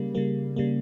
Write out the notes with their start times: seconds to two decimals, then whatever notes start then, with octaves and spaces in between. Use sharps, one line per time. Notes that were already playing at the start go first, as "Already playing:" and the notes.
Already playing: C#3 G3 A#3
0.15 C#3 G3 A#3
0.56 C#3 G3 A#3